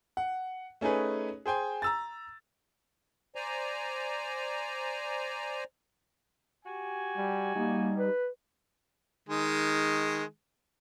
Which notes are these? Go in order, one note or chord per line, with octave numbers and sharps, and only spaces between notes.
F#5
A3 C#4 D#4 G#4 B4
G#4 C5 G5 G#5
A#5 E6 A6
C5 D5 G#5 A#5
F#4 G4 G#5
G3
G3 A#3 D#4
B4
D#3 G#3